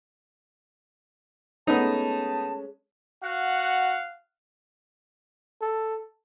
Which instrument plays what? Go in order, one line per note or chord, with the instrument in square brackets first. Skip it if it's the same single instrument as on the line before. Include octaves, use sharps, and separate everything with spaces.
[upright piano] G#3 A3 C#4 [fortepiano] B3 D#4 [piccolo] A5
[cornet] F#4 [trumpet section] F5 F#5
[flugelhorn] A4